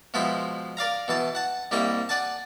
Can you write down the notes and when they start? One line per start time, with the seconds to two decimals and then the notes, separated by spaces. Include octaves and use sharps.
0.14 B2 F3 G#3 E4 C5 B5
0.77 A#4 D5 F5 A#5
1.08 B2 E3 A5
1.35 F#5 A5
1.71 C2 G3 A#3 E4 D#5 C#6
2.09 D5 F#5 G#5 A5